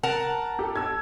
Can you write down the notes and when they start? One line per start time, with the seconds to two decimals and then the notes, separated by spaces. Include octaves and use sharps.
0.03 A#4 F#5 A5
0.59 G4 A4
0.76 A5 E6 G#6